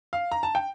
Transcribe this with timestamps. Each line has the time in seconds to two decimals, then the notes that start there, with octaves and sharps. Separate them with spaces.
0.13 F5
0.32 A#5
0.43 A5
0.55 G5